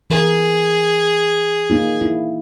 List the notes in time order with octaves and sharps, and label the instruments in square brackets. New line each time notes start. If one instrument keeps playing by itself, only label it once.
[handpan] E3 A#4 [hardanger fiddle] G#4
[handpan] A#3 D#4 F4
E4